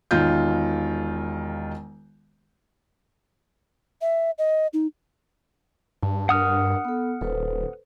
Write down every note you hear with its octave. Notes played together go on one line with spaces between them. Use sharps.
E1 D#3 F4 G6
E5
D#5
D#4
G2 A5
D4 A#4 F#5 D#6 F6
B3 A4
D#1 A4 B4 C5